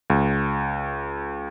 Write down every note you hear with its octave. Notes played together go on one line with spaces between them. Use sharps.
C#2